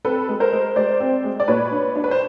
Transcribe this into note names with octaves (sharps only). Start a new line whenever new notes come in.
C4 A4 B4
G#3
A#4 C5
G#3
G#3 C5 D5
C4
G#3
D5
A#2 B4 C#5
D4
D4
B4
C5